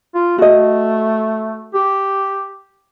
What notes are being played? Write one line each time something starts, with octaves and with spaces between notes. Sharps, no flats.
F4
A3 F#4 D#5
G4